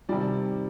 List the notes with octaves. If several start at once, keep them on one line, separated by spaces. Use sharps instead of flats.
C3 D#3 G3 D5